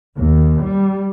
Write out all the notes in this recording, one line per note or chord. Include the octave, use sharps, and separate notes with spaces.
D#2
G3